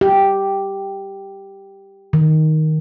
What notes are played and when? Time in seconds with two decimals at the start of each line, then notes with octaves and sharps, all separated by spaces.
0.01 G4
2.13 D#3